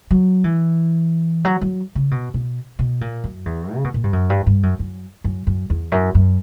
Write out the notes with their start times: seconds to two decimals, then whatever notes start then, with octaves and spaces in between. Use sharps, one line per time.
0.11 F#3
0.44 E3
1.45 F#3
1.61 F#3
1.95 C#3
2.11 B2
2.34 B2
2.79 B2
3.01 A#2
3.24 F#2
3.46 E2
3.75 C#3
3.84 B2
3.94 A#2
4.04 G2
4.13 F#2
4.30 G2
4.46 G2
4.63 F#2
4.79 F#2
5.24 F#2
5.47 F#2
5.70 E2
5.92 F#2
6.15 F#2